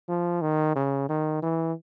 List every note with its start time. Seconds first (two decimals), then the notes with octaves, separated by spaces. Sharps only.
0.08 F3
0.42 D#3
0.75 C#3
1.09 D#3
1.43 E3